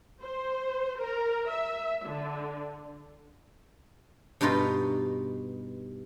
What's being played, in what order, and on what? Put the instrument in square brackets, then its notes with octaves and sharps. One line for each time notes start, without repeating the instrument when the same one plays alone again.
[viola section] C5
A#4
E5
D3
[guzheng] G2 B2 D#4 F4 B4